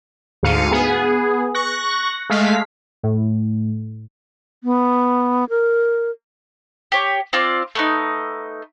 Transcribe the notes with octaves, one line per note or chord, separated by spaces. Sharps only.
D2 G#2 F5 C#7 D#7
B3 G#4
C#6 F#6 A#6
G#3 A3 F5 B6
A2
B3
A#4
G4 C#5
C4 F4 D5
A3 B3 D#4